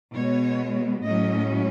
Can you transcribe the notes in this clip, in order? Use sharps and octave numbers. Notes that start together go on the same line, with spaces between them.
B2 G#3 B3 C#5
A2 F#3 A3 C#4 D#5